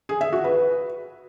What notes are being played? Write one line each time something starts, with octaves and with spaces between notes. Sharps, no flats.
G#4
E5
F#4
B4